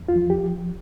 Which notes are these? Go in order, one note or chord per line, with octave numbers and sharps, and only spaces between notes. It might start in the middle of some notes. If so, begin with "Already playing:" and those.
Already playing: E2
F4
F3
G4